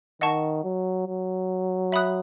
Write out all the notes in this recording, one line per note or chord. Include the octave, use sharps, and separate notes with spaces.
D#3 D#5 F#5 A5 C#6
F#3
F#3
E5 B5 D#6 F#6